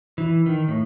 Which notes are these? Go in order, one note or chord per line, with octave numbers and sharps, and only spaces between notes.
E3
D#3
A2